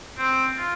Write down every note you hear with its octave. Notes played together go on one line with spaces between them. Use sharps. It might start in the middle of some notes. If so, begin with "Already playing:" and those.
C4
F4